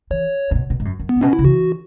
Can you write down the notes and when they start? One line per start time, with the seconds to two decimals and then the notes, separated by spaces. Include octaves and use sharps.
0.11 E3 C#5
0.51 G#2
0.55 B2
0.70 B2
0.80 G#2
0.85 F#2
0.99 F#2
1.09 B3
1.16 G#2
1.21 B2 C#4
1.33 E4
1.39 C#3
1.44 E3 F#4